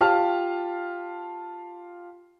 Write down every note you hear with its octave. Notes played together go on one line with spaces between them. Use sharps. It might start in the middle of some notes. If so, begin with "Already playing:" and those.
F4 G4 F5 A5 F6